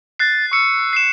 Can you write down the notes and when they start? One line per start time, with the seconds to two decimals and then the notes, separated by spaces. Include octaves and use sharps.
0.19 F#6 A6 C7
0.51 C#6 E6 C#7
0.93 C7 E7